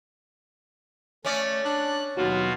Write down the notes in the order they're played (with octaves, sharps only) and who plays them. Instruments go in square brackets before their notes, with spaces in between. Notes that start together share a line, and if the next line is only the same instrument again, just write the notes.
[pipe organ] A3 [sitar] C#4 D5
[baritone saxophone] D4 [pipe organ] F#6
[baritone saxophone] D#2 [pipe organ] B2 F4 F#4 [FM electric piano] F#3